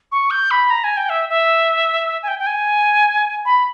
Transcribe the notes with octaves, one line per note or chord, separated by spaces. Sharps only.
C#6
G6
B5
A#5
G#5
G5
E5
E5
G#5
G5
G5
G#5
B5